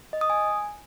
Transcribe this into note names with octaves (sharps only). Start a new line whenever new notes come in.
D#5
D#6
G#5